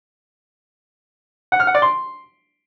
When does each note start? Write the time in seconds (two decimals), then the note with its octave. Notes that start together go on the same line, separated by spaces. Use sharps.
1.52 F#5
1.60 F6
1.67 F#5
1.75 D5
1.82 C6